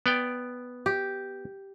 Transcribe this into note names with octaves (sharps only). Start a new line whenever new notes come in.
B3 D5 G5
G4